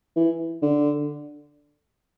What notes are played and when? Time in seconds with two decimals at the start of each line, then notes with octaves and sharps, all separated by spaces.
0.16 E3
0.62 D3